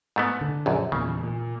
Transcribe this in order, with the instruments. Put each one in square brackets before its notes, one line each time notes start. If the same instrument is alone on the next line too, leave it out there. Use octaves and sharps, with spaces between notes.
[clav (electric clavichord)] G#2 A3 B3
[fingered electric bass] D3
[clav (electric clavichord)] A#1 F#2
[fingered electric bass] E2 A#2 [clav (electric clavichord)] C#3
[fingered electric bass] A#2